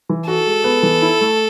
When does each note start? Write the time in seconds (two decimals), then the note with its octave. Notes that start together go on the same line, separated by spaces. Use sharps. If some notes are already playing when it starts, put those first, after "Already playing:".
0.09 E3
0.27 F#4 A4
0.46 G#3
0.64 B3
0.83 E3
1.02 E4
1.21 A3